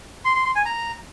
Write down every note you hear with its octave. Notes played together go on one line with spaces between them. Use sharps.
C6
C6
C6
G#5
A#5